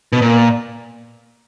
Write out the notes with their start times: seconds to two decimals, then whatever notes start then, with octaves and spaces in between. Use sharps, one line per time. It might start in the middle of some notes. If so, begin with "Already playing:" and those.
0.13 B2
0.22 A#2